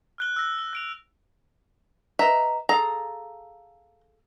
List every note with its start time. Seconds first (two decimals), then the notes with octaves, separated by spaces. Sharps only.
0.18 F6 F#6 G7
0.36 E6 A#6
0.59 G7
0.73 F#6 D7 F7
2.19 B4 D#5 E5 A#5
2.69 G#4 A4 F5 A#5